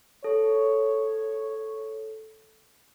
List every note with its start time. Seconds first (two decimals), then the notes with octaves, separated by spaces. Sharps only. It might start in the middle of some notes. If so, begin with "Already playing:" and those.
0.24 A4 C#5